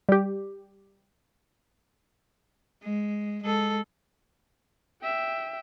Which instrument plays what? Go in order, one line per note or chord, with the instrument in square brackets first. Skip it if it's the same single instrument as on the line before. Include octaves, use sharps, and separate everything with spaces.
[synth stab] G3 G4
[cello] G#3
G#3 A4
[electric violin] E5 G5